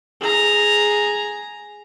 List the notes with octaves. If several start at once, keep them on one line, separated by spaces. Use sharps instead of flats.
G#4 A#5